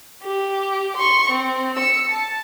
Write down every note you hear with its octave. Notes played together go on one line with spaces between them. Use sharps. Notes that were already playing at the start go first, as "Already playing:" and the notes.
G4
C6 C#6
C4
E6 C#7
A5